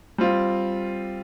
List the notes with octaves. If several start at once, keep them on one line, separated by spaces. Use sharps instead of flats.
G3 C4 F4